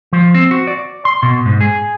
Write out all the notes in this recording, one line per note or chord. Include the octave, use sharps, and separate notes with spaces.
F3
C4
F#4
D5
C6
B2
G#2
G#4